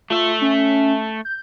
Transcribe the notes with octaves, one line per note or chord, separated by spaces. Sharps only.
A3 F4 E5
C#4
G6